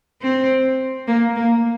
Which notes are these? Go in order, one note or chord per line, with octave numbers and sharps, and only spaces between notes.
C4
A#3
A#3